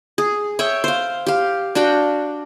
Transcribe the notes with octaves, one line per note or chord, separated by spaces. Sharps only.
G#4
C#5 E5 G5
C5 F5
G4 F5
D4 F#4 F5 G5